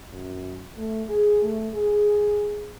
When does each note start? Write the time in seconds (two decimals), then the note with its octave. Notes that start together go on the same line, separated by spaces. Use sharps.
0.11 F#2
0.77 A3
1.09 G#4
1.42 A3
1.74 G#4